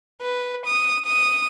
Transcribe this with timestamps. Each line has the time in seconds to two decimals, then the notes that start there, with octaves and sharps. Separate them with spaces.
0.21 B4
0.66 D#6
1.06 D#6